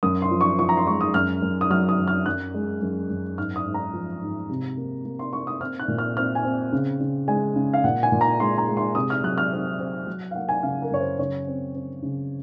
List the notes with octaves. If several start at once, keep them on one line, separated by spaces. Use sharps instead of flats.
F#2 D#6
C6
F3
C#6
F3 C#6
A#5
C6
G#3 C#6
D#6
F#2 F6
F#2
D#6
F#3 F6
D#6
F#2
F6
F#2 F#6
G#3
F#2
F#2
G#2 F6
D#6
G#2
A#5
F3
G#2
C3
A#3
A#3
C6
A#3 C#6
D#6
C4 F6
F#6
A#2
F6
C4 F6
G#5
C4
C#3
C#3
G#3 G#5
C#3
F5
A#2 F#5
G#5
A#2
A#5
G#3 C6
A#5
G#3
C6
C3 D#6
F6
F#3 F#6
F6
C4
C4
F#3
F5
A#3 F#5
G#5
C#3 F5
A#4
F#2 C#5
C5
C#3 C#5
C4
C4
C#3